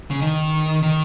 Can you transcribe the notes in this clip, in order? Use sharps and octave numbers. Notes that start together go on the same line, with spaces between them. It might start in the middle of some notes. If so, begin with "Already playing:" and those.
C#3
D#3
D#3